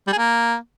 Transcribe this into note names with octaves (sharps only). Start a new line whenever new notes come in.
G3
G#4
A#3